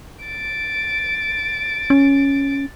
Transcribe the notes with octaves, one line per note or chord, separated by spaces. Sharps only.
A6 D7
C#4